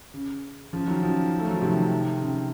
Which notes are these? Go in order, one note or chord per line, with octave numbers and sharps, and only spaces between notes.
C#3
C#3 F3
D#3 F#3
C#3 F3
A3
F#3
F3
C3 D#3
C#3